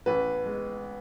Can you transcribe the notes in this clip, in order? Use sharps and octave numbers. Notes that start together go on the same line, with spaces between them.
A1 B4
G#3